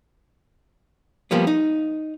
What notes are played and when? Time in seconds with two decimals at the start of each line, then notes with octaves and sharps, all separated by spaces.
1.31 F3 G3 A#3 B3
1.47 D#4